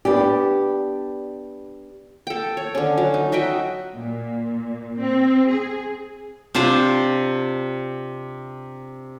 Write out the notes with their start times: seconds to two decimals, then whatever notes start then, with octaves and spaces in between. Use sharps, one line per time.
0.05 B3 D4 G4
2.27 A4 G5
2.57 C#5
2.75 D3 C#4
2.98 F#3
3.14 D#4
3.32 F#4 D#5 E5 G5
3.93 A#2
4.98 C4
5.48 G#4
6.55 C3 D4 F4 C5